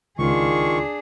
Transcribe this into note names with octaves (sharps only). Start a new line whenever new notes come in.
C#2 D#3 D4 F4 G#4 C#6